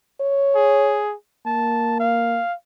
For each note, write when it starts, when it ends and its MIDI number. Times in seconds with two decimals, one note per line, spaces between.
0.21 1.02 73
0.55 1.14 68
1.46 2.41 58
1.46 1.95 81
2.00 2.54 77